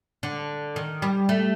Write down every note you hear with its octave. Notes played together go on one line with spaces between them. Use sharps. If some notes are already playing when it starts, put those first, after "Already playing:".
D3
D#3
G3
A3